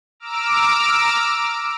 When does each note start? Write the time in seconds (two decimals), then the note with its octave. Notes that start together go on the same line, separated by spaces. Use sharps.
0.20 A#5 D6 E6 F6 D7